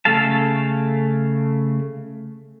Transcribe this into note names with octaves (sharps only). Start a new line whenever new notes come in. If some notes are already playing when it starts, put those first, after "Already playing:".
C#3 A3 A4 F5 A5